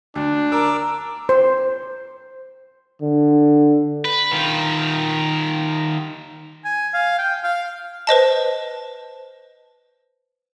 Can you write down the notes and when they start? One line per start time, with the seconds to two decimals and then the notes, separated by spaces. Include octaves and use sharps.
0.15 D2 D4
0.52 A#4 A#5 D6 E6
1.29 C5
3.02 D3
4.05 B4
4.32 D#3 F4
6.64 G#5
6.94 F5
7.18 G5
7.44 F5
8.07 B4 C5 D#5 A5